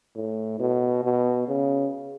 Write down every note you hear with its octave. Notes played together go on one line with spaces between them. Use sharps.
A2
B2
B2
C#3